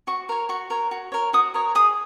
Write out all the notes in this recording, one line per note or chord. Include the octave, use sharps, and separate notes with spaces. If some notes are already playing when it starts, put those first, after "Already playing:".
F#4 C#6
A#4 C#5
F#4 C#6
A#4 C#5
F#4
A#4 C#5
F#4 D#6
A#4 C#5
G#4 D#6